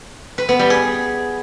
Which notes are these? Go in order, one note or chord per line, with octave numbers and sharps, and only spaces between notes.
B4
B3
G3
G#4